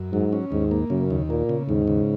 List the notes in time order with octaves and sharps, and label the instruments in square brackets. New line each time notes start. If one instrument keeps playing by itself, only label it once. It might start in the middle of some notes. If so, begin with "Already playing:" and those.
Already playing: [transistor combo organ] F#2
[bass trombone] G#2 [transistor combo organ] F#3
[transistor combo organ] C#4
[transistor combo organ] D#2 [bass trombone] G#2
[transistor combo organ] A#3
[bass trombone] F#2 [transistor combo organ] C#3
[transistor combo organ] D#2
[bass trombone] A#2 [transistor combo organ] A#3
[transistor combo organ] C#3
[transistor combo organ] D#2 [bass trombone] G#2
[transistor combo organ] C#3